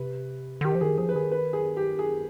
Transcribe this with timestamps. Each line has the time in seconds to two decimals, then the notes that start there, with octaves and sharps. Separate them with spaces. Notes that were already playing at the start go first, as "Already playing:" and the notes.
Already playing: C3 B4
0.61 D3
0.65 D#3 G4
0.75 F3
0.81 D#3 G#4
0.98 F3 G#4
1.09 B4
1.15 D#3 G#4
1.31 B4
1.53 G#4
1.77 G4
1.99 G#4